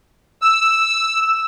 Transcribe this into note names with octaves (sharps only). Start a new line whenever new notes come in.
E6